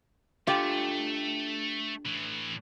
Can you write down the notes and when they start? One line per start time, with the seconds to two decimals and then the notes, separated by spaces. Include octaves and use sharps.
0.47 A3 D4 F4 G4 A4 G5
2.05 A2 E3